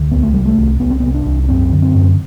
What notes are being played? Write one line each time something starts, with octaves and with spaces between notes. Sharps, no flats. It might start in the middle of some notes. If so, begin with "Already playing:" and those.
Already playing: D2
C2 B3
A3
C3 G3
A3
C2
C2 B3
C4
C3 B3
D4
C2
D4
F#2 C4
D3
C4
F#2